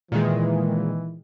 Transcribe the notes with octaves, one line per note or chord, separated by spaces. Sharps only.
A#2 D#3 E3 G#3